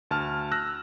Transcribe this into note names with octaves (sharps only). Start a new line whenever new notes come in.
D2 A5 F6
E6 F#6 A#6